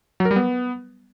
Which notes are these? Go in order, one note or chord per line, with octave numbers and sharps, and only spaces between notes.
F#3
A#4
G3
B3